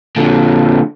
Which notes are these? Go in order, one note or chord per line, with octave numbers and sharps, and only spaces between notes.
A#2 D3